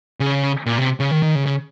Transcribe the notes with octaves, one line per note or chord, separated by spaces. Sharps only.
C#3
A#2
C3
C#3
D#3
D#3
C#3
C#3